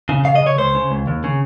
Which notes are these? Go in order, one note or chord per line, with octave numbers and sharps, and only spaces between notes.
C#3
C#3 F5
D#5
C#3
C#5
C#2 C5
C#3
C#2
D#2
C#3